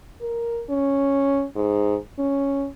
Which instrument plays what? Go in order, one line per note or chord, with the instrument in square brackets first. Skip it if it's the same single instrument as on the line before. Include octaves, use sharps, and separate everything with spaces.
[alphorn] A#4
C#4
G#2
C#4